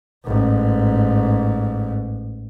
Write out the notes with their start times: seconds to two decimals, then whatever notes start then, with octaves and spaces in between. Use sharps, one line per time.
0.25 A1 G#2